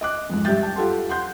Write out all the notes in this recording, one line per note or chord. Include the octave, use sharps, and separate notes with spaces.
D#5 D6 F#6
F2 G#2
G2 G4 E5 G6 A6
G5 A5
F4 G4 A4 F#5 C6
F#5 C6 G6